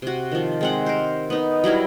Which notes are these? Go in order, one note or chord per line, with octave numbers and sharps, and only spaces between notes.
C3 F#4
D#3 F3
G#3 C4 F#5
A#4 C5
B3 D#4
F#3 G3 E4 A#4